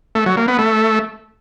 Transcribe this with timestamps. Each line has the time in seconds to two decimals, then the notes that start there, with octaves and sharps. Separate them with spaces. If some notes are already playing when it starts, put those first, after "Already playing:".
0.15 A3
0.26 F#3
0.37 A#3
0.48 B3
0.59 A3